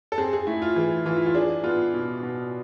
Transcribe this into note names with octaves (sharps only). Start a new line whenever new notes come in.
A4
C4 G#4
G#4
A3 E4
F4
E3 G#4
E3 F4
E4
F4
D4 G#4
B3 F4
B2
B2